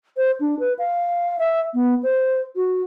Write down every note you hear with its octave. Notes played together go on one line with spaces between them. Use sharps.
C5
D4
B4
F5
E5
B3
C5
F#4